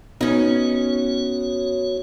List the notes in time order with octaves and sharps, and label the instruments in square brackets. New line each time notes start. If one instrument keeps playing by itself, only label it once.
[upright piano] B3 [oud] C#4 D#4 [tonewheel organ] F#4 C#5